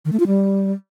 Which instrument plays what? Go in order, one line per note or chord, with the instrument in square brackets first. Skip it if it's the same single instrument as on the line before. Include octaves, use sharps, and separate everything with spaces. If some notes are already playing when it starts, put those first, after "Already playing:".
[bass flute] D#3
A3
F4
G3